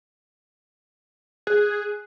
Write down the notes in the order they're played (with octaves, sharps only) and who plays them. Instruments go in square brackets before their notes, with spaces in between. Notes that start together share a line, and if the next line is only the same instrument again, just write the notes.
[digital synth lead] G#4 [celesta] F#6